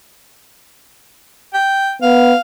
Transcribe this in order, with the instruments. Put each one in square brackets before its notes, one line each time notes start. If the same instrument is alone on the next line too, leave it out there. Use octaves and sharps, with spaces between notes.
[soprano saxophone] G5
[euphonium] B3 [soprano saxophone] F5